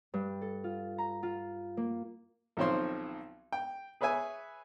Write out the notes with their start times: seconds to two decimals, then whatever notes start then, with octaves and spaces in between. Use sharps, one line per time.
0.14 G2
0.41 A4
0.64 F4
0.98 A#5
1.23 F4
1.77 A#3
2.57 B1 D#3 F3 C4 C#5 C6
3.52 G5
4.01 G#4 B4 C#5 E5 G#5